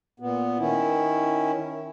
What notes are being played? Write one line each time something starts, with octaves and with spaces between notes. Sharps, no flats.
A#2 B3
D#3 C#4 E4